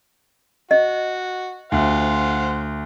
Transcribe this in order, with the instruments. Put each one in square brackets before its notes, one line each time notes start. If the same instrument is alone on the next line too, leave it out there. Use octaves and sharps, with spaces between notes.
[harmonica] F#4 [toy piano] D#5
[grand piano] D2 [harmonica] C5 F5 F#5